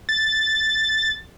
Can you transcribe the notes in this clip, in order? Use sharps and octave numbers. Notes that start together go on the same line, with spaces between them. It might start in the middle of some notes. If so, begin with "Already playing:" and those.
A6